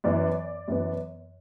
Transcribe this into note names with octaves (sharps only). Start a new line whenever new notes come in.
F#2 E3 B3 D5
F#2 E3 B3